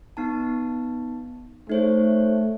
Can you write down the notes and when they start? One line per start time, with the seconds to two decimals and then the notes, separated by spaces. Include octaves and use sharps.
0.17 B3 D#4 A5
1.70 A3 D#4 C5 C#5